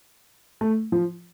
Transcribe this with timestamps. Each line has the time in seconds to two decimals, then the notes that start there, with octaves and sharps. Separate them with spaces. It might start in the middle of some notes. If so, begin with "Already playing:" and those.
0.61 A3
0.92 F3